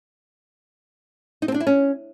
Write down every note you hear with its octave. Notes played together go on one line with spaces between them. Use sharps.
D#4
C4
D4
E4
C#4